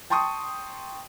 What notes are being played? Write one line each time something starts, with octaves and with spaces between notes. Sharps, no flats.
G5 A5 C6 C#6 D#6